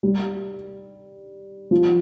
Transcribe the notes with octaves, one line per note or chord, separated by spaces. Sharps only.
G3
F3